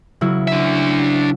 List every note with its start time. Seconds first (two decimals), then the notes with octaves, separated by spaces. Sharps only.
0.21 C#3 F#3 E4
0.48 D4 E5